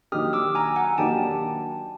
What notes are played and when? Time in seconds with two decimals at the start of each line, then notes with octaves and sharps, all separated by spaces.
0.12 D#3 F#3 A#3 D4 G4 D#6 F6
0.33 D6 E6
0.55 G#5 A#5
0.76 F#5 G#5
0.98 D#3 F#3 A#3 D4 G4 G5 A5